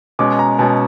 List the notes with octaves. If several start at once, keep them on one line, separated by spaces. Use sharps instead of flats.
B2 G#3 C#4 D6
A#5
B2 G#3 C#4 A5